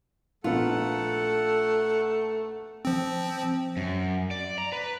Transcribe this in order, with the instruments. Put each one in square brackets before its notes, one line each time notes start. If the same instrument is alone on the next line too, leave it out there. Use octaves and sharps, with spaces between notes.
[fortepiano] A#1 B3 [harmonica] A3 [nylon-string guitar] F4 [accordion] A4 F#5
[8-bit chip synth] F3 C4
[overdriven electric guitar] F#2
D5
A#5
B4